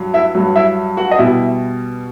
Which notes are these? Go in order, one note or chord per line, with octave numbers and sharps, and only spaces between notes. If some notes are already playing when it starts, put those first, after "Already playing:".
Already playing: G2 F#3
E4 E5
G2 F#3
E4 E5
F#4 F#5
D#5
B2 G3 E4 E5